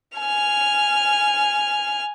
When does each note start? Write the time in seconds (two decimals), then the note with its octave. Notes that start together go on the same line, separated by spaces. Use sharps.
0.18 G#5 F6